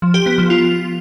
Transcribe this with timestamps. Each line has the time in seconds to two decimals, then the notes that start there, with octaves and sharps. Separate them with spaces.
0.02 F3
0.14 G4
0.26 B3
0.38 F3
0.50 F4